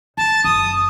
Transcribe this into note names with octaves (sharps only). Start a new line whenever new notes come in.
C#3 A5
F#1 D#6